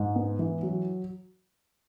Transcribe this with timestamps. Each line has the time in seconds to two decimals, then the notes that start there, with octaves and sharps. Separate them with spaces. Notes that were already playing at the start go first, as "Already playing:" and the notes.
Already playing: G#2
0.16 B3
0.39 E3
0.63 F#3